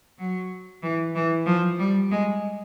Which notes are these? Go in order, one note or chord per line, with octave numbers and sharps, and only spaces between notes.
F#3
E3
E3
F3
G3
G#3